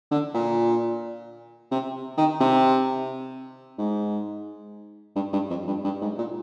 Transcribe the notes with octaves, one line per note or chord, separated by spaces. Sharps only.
D3
A#2
C3
D#3
C3
G#2
G2
G2
F2
G2
G2
G#2
A#2